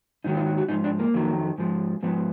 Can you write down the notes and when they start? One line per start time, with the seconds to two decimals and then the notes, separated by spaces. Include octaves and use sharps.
0.24 G#2 D#3 F#3 D#4
0.36 F4
0.47 F#4
0.58 F#4
0.69 G#2 F3 D#4
0.84 D4
0.99 A#3
1.14 F2 D#3 F#3
1.58 G#2 F3
2.03 G#2 F3 B3